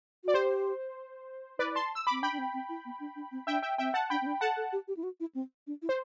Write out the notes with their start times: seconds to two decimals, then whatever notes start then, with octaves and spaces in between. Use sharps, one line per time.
0.24 F#4 D5
0.34 G4 C5
1.59 E4 B4 D5
1.75 A5 C6
1.95 E6
2.07 C4 B5 D6
2.22 D4 G5 B5
2.32 D4
2.38 C4
2.54 C4
2.69 E4
2.85 B3
3.00 D4
3.16 D4
3.32 C4
3.47 D4 E5 G5
3.63 E5 G5
3.78 C4 E5 G5
3.94 F#5 A5
4.10 D4 G5 B5
4.21 C4
4.26 D4
4.41 A4 F#5 A5
4.57 A4
4.73 G4
4.88 G4
4.97 E4
5.03 F#4
5.20 E4
5.35 C4
5.67 D4
5.82 E4
5.89 C5